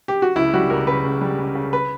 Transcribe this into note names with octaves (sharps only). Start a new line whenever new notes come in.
G4
F#4
C#2 E4
G3 F#4
C#2 A#4
C#3 B4
C#2
G3
C#2
C#3
B4